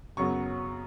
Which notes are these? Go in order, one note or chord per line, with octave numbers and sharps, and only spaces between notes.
F#2 C#3 F#3 B3 C#6